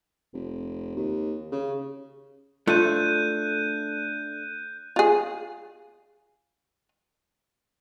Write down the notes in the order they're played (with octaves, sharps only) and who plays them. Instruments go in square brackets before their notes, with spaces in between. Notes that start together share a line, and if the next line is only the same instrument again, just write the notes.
[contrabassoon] F1
D#2
C#3
[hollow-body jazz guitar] A3 D4 [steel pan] F4 [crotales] F#6 G6 D#7
[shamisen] F4 G#4